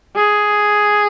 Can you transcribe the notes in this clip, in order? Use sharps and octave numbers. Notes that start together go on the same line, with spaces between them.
G#4